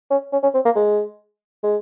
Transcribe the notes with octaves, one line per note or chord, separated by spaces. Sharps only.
C#4
C#4
C#4
C4
A#3
G#3
G#3